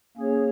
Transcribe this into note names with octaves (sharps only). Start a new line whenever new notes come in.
A#3 C#4 G#4 C#5